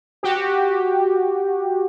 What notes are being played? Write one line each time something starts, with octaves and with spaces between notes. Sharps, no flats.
F#4 G4